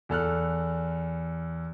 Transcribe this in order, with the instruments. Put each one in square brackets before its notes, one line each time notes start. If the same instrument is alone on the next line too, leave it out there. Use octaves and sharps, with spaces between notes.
[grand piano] E2 A4 F6 F#6